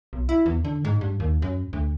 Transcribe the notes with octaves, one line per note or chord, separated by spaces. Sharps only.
B1
E4
E2
D3
G#2
G2
D#2
F#2
D2